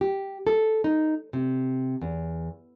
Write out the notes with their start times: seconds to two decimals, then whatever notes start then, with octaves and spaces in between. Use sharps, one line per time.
0.01 G4
0.47 A4
0.84 D#4
1.33 C3
2.01 E2